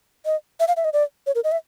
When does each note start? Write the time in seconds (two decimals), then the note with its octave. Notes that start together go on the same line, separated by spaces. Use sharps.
0.26 D#5
0.60 E5
0.68 F5
0.77 E5
0.85 D#5
0.93 D5
1.27 C#5
1.35 A#4
1.44 D#5
1.52 E5